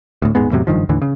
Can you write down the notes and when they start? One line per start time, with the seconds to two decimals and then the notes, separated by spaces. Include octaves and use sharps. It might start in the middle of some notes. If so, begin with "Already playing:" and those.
0.22 D2 A2
0.35 D#1 G#2 G#3 B3
0.51 E2 A2 C3 F#3
0.67 F#1 G2 D#3 F3
0.89 D#2 A2 D3 E3
1.02 C#3